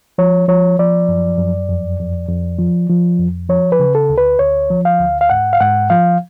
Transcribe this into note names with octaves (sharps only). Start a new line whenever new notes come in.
F3 C#5
F3 C#5
F3 D5
F#2
F#2
F2
F2
F2
F3
F3
F2
F3 C#5
B4
C#3
A4
D2
B4
D2 C#5
F3
F5
D2
F5
G#2 F#5
F5
G#2 F#5
F3 F5